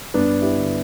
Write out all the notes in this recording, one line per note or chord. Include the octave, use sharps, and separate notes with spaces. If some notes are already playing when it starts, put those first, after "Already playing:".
G2 B3 D4
E4 G4
D3